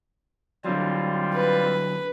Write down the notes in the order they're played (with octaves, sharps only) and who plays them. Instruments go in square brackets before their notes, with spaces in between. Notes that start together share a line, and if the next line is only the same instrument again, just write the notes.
[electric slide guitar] D3 F#3 [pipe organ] G3 C4 F4
[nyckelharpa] B4